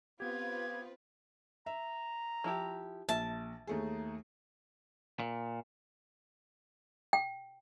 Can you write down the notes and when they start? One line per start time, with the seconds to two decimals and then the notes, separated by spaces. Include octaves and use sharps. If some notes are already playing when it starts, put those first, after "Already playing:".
0.20 B3 C4 F4 G4 B4 G#6
1.66 E5 A#5
2.44 F3 E4 G4
3.09 A#1 E5 A5
3.67 D#2 A3 D#4 G#4
5.20 A#2
7.13 G5